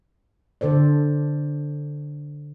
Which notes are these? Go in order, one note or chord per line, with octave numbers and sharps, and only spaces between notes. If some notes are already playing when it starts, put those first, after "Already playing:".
D3 A4 C5 D5